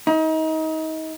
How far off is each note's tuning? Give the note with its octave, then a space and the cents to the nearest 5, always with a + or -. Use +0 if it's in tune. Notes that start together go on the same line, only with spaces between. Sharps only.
D#4 +30